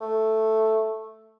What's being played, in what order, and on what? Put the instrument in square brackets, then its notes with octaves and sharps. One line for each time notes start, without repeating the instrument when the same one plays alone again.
[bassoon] A3